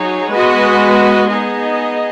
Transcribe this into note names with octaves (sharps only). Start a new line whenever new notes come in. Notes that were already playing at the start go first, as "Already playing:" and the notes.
Already playing: F#3 D#4 G#4 C#5
G#3 B3 F#4 B4 D#5
B3 D#4 G#4 D#5